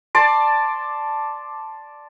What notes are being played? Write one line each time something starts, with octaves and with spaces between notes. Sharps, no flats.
D5 A5 C6 D6